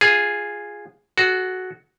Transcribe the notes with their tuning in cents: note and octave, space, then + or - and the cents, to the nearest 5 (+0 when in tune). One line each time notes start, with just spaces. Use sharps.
F4 +0 G#4 -5
F#4 +0 A4 -45